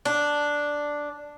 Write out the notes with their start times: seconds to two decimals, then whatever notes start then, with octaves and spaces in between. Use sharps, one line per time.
0.05 D4